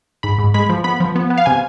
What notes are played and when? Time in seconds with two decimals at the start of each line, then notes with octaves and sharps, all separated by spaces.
0.23 G#2 B5
0.39 G#2
0.54 G#3 B5
0.69 F3
0.84 B3 B5
1.00 F3
1.16 B3
1.30 B3
1.38 F5
1.46 C3 G#5